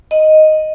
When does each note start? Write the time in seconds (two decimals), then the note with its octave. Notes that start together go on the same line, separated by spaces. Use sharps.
0.11 D#5